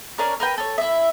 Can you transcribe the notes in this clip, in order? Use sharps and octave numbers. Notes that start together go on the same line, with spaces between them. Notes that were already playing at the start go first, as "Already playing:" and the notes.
C#4 D4 A#4 C#5
A#4 B4 G5
A4 C#5
E4 E5